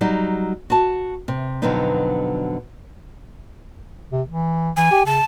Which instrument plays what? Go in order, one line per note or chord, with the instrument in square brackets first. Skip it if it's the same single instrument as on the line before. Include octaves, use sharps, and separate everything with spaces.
[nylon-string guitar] F#3 G3 D#4
F#4 A5
C3
F2 B2 D3 F#3 B3 D#4
[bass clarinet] C3
E3
[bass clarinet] E3 [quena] G#5
[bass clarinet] G4
[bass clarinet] C#3 [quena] A5